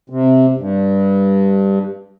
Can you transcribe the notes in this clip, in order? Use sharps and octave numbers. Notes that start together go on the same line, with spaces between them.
C3
G2